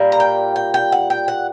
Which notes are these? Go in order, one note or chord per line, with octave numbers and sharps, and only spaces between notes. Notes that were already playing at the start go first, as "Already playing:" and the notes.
Already playing: A#2 G3 A#3
A#5
G5
G5
G5
F#5
G5
F#5